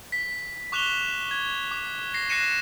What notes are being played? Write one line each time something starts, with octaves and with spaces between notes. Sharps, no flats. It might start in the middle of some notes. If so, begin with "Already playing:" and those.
B6
C#6 D6 F#6 E7 F7 G7
G#6
D6
A#6 C7
F#6 A#6 C7 C#7 D#7 E7